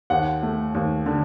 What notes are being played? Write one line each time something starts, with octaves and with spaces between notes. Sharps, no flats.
D#2 F#5
A3
D#2
D3